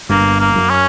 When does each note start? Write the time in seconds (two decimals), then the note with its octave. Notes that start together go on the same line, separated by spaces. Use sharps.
0.09 G1 G2 A#3
0.40 A#3
0.55 F#2
0.70 C#4